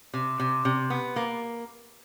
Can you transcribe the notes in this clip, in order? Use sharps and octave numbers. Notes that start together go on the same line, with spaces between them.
C3
C3
C3
B3
A#3